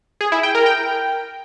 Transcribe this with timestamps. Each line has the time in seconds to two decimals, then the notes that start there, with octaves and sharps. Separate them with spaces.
0.21 G#4
0.32 E4
0.43 G5
0.55 A#4
0.66 G5